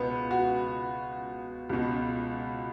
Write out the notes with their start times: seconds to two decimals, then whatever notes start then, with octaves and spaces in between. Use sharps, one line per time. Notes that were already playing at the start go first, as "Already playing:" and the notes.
Already playing: C#2 B2 B3
0.31 F#4
1.69 C#2 B2